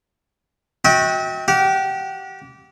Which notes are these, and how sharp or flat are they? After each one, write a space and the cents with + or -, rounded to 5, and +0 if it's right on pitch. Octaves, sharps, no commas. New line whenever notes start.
F#4 -20 E5 -45 G5 +0
G4 -25 F#5 -30